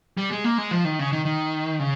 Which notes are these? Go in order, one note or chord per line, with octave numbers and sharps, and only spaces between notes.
G3
G#3
A#3
G#3
F3
D#3
C#3
D#3
D#3
C#3